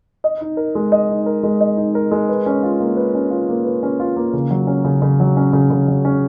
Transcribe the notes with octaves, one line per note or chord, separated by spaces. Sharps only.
D#5
D#4
A#4
G#3
D#5
D#4
A#4
G#3
D#5
D#4
A#4
G#3
B4
C#4
F4
A#3
B4
C#4
F4
A#3
B4
C#4
F4
A#3
C#3
F#3
C#4
C#3
C#3
F#3
C#4
C#3
C#3
F#3
C#4